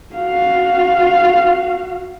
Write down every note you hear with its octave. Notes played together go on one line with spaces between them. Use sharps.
F#4 F5